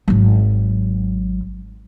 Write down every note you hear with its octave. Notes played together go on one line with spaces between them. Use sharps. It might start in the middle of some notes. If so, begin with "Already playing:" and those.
G#1 F#3